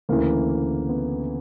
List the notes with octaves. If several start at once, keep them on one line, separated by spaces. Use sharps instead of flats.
D2 C#3 E3 A#3
B3